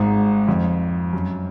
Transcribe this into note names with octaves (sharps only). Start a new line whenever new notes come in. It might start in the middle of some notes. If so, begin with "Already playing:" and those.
Already playing: G#1 G#2
F2
F#2